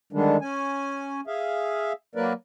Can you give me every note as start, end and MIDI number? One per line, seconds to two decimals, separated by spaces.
0.13 0.37 50
0.13 0.37 51
0.13 0.37 55
0.13 0.37 56
0.13 0.37 62
0.41 1.21 61
0.41 1.21 80
1.27 1.93 68
1.27 1.93 76
1.27 1.93 77
2.15 2.33 54
2.15 2.33 58
2.15 2.33 70
2.15 2.33 71
2.15 2.33 74